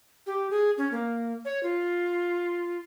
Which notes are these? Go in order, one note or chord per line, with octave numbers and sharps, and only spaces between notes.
G4
G#4
C#4
A#3
C#5
F4